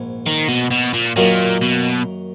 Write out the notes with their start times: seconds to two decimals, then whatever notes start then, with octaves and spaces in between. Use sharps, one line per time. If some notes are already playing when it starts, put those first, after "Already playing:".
Already playing: A#1 G#2
0.26 D#3
0.48 B2
0.71 B2
0.94 A#2
1.16 F#2 A#2 D#3 A#3 F4 A#4
1.61 B2